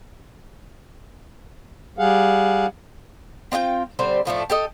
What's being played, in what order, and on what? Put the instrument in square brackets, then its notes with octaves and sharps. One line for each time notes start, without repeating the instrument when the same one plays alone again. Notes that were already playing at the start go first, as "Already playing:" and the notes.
[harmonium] G3 G#4 F5 F#5
[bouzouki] C4 D4 F4 G5
D3 G3 C4 C5
A2 F3 A3 D4
G4 A4 D#5